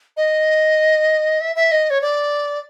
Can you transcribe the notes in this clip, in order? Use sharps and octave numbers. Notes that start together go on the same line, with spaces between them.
D#5
E5
E5
D#5
C#5
D5